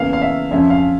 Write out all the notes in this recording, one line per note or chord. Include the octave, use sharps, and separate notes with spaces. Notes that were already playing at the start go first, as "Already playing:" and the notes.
Already playing: E2 C#3 E3 A#3 F5
F5
E5
F2 C#3 F3 C#4 E5
F5